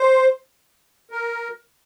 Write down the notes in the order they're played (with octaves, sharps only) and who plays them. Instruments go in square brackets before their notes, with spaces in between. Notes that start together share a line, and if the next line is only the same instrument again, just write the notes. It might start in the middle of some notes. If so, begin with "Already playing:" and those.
Already playing: [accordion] C5
A#4